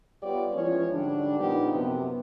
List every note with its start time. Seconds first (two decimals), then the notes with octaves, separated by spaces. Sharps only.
0.23 G3 B3 F4 G4 C#5 D5
0.54 E3 F3 G#3 C#4 F4 C#5
0.92 G#2 D3 G3 D4
1.40 A#2 F3 A#3 B3 D#4 G4
1.73 F#2 C3 B3